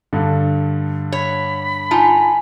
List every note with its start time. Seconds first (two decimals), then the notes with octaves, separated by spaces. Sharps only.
0.13 G2 D3
1.12 C#5 B5
1.91 D#4 F4 G#5 A5